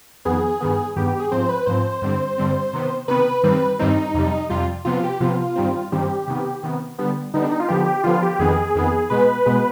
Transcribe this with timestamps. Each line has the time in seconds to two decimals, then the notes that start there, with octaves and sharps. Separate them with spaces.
0.25 F2 D#3 B3 G#4
0.60 G2 D#3 B3
0.96 G2 D#3 B3 G4
1.08 G4
1.20 G#4
1.32 G#2 F3 C4 C5
1.49 B4
1.66 G#2 F3 C4 C5
2.02 G2 D3 G3 C4
2.38 G2 D3 G3 C4
2.73 C3 D#3 B3
3.08 C3 D#3 B3 B4
3.43 G2 D#3 G3 C4
3.79 G2 D#3 G3 C4 D#4
4.14 F2 C3 G3
4.49 F2 C3 G3 F4
4.85 C3 F3 B3 F4
5.03 G4
5.20 C3 F3 B3 F4
5.56 G2 D#3 G3 C4
5.92 G2 D#3 G3 C4 G4
6.28 C3 D#3 B3
6.63 C3 D#3 B3
6.98 D3 G3 B3
7.34 D3 G3 B3 D#4
7.42 D4
7.51 D#4
7.60 F4
7.68 D3 F3 B3 G4
7.86 G4
8.04 D3 F3 B3 F4
8.22 G4
8.39 F2 D#3 B3 G#4
8.75 F2 D#3 B3
9.10 B2 G#3 B3 B4
9.46 B2 G#3 B3